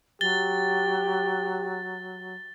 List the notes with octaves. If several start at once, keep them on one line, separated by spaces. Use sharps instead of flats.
F#3 G4 A6 G7